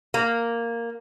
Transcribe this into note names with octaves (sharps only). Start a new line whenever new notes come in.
A#3